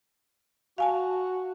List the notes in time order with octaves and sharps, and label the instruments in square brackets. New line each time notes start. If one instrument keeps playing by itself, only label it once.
[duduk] F#4 [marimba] F5 G#5 A5